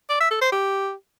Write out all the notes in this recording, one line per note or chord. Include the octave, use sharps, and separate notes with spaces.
D5
E5
A4
C5
G4